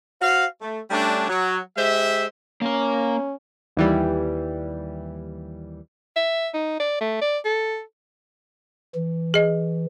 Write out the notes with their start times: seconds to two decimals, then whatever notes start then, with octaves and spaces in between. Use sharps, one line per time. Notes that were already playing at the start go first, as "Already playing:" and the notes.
0.21 F#4 C5 F5
0.61 A3
0.90 G3 A3 C#4 D4
1.28 F#3
1.77 G#3 G4 C5 E5
2.62 A#3 C#4 A#4
3.77 D#2 E3 G3
6.16 E5
6.54 D#4
6.80 D5
7.01 A3
7.21 D5
7.45 A4
8.95 E3
9.34 G#4 D#5